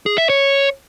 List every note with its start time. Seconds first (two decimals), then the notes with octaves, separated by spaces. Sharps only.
0.06 G#4
0.18 E5
0.29 C#5